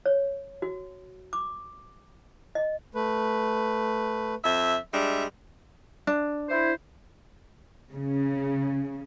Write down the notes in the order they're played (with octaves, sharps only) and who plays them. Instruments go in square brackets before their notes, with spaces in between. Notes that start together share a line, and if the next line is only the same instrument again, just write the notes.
[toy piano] C#5
F#4
D6
D#5
[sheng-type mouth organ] A3 B4
[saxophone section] F2 E5
[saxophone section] G3 G#3 D4 [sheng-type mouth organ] E5
[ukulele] D4
[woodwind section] E4 C5
[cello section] C#3